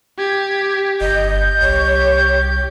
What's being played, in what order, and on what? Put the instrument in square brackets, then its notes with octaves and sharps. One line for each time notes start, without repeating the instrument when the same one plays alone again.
[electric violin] G4 [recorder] G#6
[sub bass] G1 [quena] D#5 [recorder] G6
[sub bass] C2 [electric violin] G4 [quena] C#5